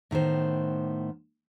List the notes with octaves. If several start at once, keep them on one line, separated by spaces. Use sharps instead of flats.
A2 D#3 B3 C5